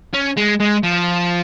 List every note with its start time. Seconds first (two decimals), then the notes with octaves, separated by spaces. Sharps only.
0.13 C#4
0.37 G#3
0.60 G#3
0.83 F3